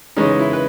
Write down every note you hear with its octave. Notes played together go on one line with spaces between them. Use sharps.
C#3 E3 G#3 C#4 D#4
E4
B4